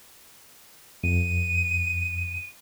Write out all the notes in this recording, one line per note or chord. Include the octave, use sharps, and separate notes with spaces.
F2 D#7